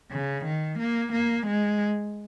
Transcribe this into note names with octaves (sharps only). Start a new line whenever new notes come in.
C#3
D#3
A#3
A#3
G#3